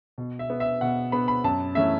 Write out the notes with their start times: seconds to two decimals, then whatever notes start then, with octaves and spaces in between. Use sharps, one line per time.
0.18 B2
0.39 E5
0.50 B3
0.60 E5
0.81 B2 F#5
1.12 B3 B5
1.28 B5
1.44 F#2 A5
1.75 E3 A3 C#4 E5